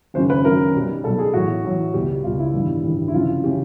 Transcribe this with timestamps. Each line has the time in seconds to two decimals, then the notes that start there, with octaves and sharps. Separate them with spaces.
0.14 G#1 F#2 C#3 C5
0.30 B4
0.45 G#1 F#2 C#3 A#4
0.74 B1 B2 G3
1.04 B1 B2 G3 A4
1.19 G#4
1.33 A1 A2 F#3 F#4
1.64 A1 A2 F#3
1.93 C#2 B2 G3 G4
2.24 C#2 B2 G3 F4
2.39 E4
2.54 A1 G2 D#3 G3
2.83 A1 G2 D#3 G3
3.08 E4
3.13 F1 F2 C#3 E3 F4
3.44 C#3 E3 G4